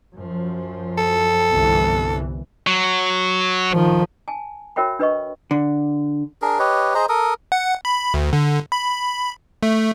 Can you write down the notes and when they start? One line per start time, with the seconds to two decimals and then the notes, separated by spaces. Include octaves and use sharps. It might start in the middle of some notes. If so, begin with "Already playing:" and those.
0.14 F#2 F3
0.98 A4
1.50 G1 C2 E3
2.67 F#3
3.72 D#3 F3
4.28 G#5 A5
4.76 F#4 A#4 C#5 E5 G5 B5
4.99 D4 B4 D#5 C#6
5.51 D3
6.42 D4 G#4 A#4
6.59 G4 B4 C#5 D#5
6.95 G#4 C5 D#5 A#5
7.09 A4 A#4 D#6
7.52 F#5
7.85 B5
8.14 D2
8.33 D3
8.72 B5
9.63 A3